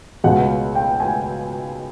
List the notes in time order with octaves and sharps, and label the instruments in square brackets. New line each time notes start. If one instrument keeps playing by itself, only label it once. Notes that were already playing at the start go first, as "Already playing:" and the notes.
[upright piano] C#2 B2 G#3 F#5
G5
G#5